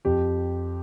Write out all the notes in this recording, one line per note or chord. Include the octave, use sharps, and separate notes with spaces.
F2 G4